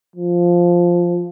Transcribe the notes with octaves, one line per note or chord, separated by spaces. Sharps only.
F3